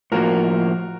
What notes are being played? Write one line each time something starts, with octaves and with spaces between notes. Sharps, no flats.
A2 F3 A#3 F#4 A#4